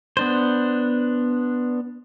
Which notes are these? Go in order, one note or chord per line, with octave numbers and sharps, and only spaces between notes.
B3 D4 C5